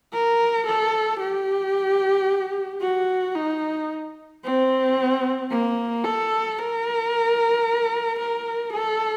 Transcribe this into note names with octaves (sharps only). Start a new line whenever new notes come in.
A#4
A4
G4
F#4
D#4
C4
A#3
A4
A#4
A#4
A4